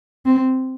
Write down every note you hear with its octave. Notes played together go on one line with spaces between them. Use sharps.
C4